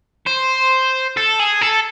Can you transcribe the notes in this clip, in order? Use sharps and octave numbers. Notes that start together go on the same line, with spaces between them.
C5
A4
G#4
A4